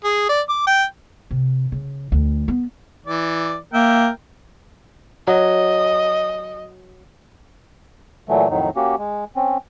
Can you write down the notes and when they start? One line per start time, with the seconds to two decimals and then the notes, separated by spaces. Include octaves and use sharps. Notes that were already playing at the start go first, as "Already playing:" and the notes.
0.04 G#4
0.29 D5
0.49 D6
0.67 G5
1.31 C3
1.72 C#3
2.12 D2
2.48 B3
3.06 E3 D5
3.74 A#3 A#4 E5 G5
5.27 F#3 D#5
8.29 A#2 E3 F#3 A3
8.50 F2 A2 D#3 F#3 D#4
8.76 A#3 C#4 F#4 G4
8.98 G#3
9.36 C4 C#4